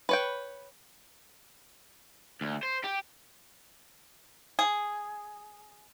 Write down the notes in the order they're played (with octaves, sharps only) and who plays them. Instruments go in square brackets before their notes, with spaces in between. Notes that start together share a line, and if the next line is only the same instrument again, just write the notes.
[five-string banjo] B4 C#5 G5
[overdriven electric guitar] D2
C5
G4
[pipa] G#4